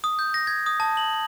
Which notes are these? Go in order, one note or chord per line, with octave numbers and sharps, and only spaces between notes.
D#6
G6
A#6
G#6
D#6
A5
F#7